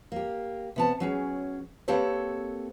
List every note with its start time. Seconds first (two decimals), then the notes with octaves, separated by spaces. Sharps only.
0.12 A#3 G4
0.76 C3 B3 A5
1.00 F#3 C#4 G#4
1.88 A#3 C4 G4 A4 B4 C#5